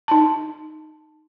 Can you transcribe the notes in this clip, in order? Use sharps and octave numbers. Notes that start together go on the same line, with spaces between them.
D#4 A5